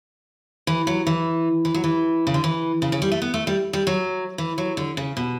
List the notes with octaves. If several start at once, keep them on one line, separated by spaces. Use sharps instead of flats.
E3
F#3
E3
E3
F#3
E3
C#3
D3
E3
C#3
C#3
G3
A3
B3
A3
G3
G3
F#3
E3
F#3
D3
C#3
B2